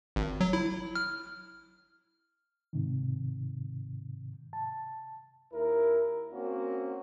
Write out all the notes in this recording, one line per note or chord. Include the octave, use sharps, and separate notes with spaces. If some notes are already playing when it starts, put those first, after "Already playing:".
G#1
F#3
E4
F6
G#2 C3 D#3
A5
D#2 E4 A#4
A#3 C4 C#4 F#4